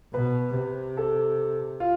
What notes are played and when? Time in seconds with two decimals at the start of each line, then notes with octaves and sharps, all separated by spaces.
0.14 B2 B4
0.55 C3
0.97 A4
1.80 F4